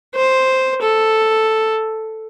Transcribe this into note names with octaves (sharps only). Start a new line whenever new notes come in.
C5
A4